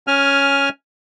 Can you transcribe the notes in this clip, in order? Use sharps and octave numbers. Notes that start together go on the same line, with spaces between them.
C#4 G#5 F6